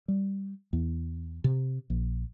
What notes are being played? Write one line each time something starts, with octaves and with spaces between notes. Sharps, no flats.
G3
E2
C3
A#1